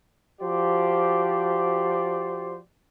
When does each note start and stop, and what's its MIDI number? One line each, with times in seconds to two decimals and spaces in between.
0.41 2.58 53
0.41 2.58 66
0.41 2.58 67
0.41 2.58 72
0.41 2.58 74